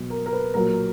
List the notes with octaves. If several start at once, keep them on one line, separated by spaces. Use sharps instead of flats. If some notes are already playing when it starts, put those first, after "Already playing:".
Already playing: B2 F#3
A#4
A#4
B4
A#2 F#3 A#4